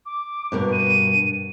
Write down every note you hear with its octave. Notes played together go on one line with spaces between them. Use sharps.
D6
G2 B2 A#4
D#7